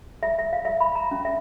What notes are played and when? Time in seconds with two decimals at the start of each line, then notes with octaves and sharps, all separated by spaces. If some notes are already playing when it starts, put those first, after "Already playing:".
0.23 E5
0.39 E5
0.53 F5
0.65 E5
0.80 B5
0.95 A#5
1.11 C#4
1.25 E5